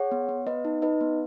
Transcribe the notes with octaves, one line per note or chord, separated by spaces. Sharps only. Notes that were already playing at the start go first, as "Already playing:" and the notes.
Already playing: G#4 C#5 F#5
B3
B3
B3 B4 D#5
D#4
D#4 B4 D#5
B3